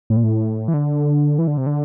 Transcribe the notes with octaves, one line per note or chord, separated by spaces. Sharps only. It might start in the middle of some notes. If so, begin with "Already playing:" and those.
A2
A#2
A2
E3
D3
E3
D3
C3
D3